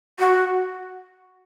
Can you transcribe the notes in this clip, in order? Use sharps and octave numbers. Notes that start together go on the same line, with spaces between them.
F#4